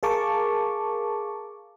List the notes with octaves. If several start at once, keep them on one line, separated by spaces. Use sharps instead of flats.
G#4 A#4 F5 A5 C#6 D6